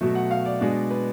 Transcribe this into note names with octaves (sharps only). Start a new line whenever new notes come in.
B2 F#3 A3
F#5
F5
D5
B2 G#3 D4
B4